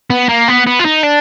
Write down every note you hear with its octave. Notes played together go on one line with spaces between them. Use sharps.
B3
A#3
B3
B3
F4
D#4
D4